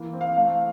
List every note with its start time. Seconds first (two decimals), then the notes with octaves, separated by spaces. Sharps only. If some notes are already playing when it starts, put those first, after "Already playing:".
Already playing: E3 A#3
0.13 C4
0.21 F5
0.36 A3 F5